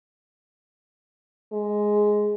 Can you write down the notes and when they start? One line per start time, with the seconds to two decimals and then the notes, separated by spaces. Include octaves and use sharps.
1.52 G#3